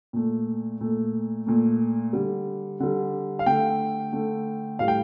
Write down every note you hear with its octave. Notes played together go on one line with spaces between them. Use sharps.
A#2 A3
A#2 A3
A#2 A3
D3 G3
D3 G3
F5
D3 A3 G5
D3 A3
A2 G3 F5
G5